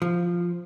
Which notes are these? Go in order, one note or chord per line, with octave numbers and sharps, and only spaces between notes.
F3